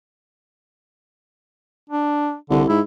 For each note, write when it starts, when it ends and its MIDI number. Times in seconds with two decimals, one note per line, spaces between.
1.90 2.35 62
2.50 2.64 36
2.50 2.63 50
2.69 2.81 44
2.69 2.80 64